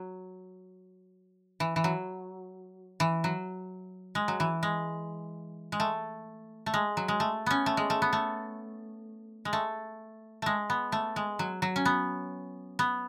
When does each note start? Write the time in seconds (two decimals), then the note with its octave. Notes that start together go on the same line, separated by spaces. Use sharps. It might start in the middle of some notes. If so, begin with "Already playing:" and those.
Already playing: F#3
1.60 E3
1.76 E3
1.84 F#3
3.00 E3
3.24 F#3
4.15 G#3
4.28 F#3
4.40 E3
4.63 G#3
5.72 G#3
5.80 A3
6.66 A3
6.74 G#3
6.97 F#3
7.08 G#3
7.20 A3
7.46 B3 C#4
7.66 A3
7.77 G#3
7.90 A3
8.02 B3
8.13 A3
9.45 G#3
9.53 A3
10.42 G#3 A3
10.70 B3
10.92 A3
11.16 G#3
11.39 F#3
11.62 F#3
11.76 C#4
11.85 B3
12.79 B3